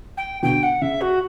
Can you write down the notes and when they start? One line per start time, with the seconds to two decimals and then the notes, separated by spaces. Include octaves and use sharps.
0.17 G5
0.42 B2 D3 G5
0.62 F#5
0.81 C#3 E5
1.01 F#4